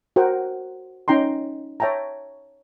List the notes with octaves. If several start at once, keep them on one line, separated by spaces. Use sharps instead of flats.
F#4 A#4 C5 F#5 G5
C#4 D#4 G5 A#5 C6
C#5 E5 G5 A5 A#5